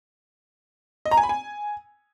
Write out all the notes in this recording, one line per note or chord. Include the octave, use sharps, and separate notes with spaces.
D#5
A#5
G#5
B5
G#5